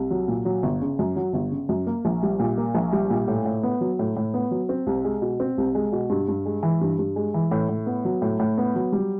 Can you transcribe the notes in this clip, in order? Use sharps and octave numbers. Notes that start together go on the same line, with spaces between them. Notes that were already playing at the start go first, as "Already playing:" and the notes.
Already playing: C2
F#3
A#2
F#3
G1
C#3
F#2
F#3
G1
C#3
F#2
A#3
A#1
G3
A#2
A#3
A#1
G3
A#2
A2
A2
B3
F#3
A2
A2
B3
F#3
C4
C2
G#3
B2
C4
C2
G#3
B2
G2
G2
G#3
E3
G2
G2
G#3
E3
A2
A2
B3
F#3
A2
A2
B3
F#3
G3